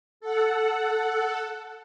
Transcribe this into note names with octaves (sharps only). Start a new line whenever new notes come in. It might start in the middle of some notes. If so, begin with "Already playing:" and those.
A4 F#5